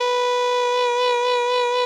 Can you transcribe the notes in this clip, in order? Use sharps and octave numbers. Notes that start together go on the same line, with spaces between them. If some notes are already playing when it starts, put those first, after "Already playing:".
B4